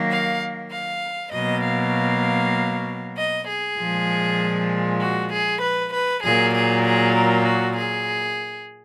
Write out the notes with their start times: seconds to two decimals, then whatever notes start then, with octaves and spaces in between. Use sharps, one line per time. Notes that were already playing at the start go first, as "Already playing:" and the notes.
Already playing: D#3 F#3 A#3
0.10 F5
0.72 F5
1.33 B2 F#3 A#3 D#5
1.64 F5
3.17 D#5
3.48 G#4
3.79 A#2 F3 G#3
5.01 F#4
5.32 G#4
5.62 B4
5.93 B4
6.24 A#2 F#3 A#3 G#4
6.54 G#4
6.85 G#4
7.15 A#4
7.46 F#4
7.77 G#4